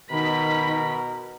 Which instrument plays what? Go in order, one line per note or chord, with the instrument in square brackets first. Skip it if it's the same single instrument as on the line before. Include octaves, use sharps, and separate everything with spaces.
[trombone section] B2 A#4 [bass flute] D#3 [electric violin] B5 B6